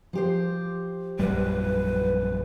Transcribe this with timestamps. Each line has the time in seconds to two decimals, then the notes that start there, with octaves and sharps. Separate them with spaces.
0.13 F3 G4 C5
1.19 A#1 F#2 G3 B4